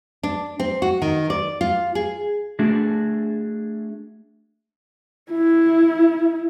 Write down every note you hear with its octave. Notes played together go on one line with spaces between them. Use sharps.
D4
C4
F#4
D#3
D5
F4
G#4
A3 D4 F#4 G#4
E4